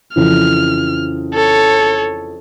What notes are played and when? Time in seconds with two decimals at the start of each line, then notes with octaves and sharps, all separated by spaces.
0.16 F2 C#3 E3 F6
1.34 A4 C#5